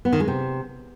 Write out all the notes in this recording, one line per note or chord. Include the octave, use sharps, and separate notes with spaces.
B3
D#3
G#3
C3